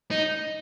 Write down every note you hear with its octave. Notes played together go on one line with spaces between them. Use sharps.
D#4